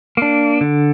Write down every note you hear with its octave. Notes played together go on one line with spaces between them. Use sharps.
A#3 D4
D3